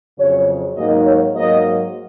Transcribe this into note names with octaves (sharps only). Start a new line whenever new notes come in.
F2 C#3 F#3 C#5
G#2 F#3 A#3 D#4 D#5
C#5
G#2 F#3 A#3 D#5